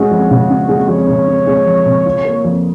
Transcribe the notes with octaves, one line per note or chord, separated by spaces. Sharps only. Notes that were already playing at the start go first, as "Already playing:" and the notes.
Already playing: G#3 C#4 F#4
F2
C#3
C#4
G#3
F2 C#5
C#3
C#4
G#3
F2
C#3
F4
A#3
F2